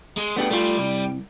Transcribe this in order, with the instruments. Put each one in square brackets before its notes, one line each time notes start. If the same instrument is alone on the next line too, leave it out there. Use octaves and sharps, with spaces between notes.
[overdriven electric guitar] G#3
[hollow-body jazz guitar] A3 D4 G4 [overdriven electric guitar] B3
[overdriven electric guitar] G3 [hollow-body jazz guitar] A3 F4
[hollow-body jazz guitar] C2